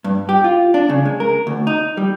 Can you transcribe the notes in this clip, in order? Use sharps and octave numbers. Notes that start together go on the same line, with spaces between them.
G2
G4
F4
D4
C#3
G#3
A#4
D2
D#4
G3